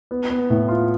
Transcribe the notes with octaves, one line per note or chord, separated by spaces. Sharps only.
B3
B3
A2
F4